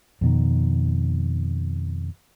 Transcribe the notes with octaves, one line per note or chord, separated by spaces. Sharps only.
F2 B2 D#3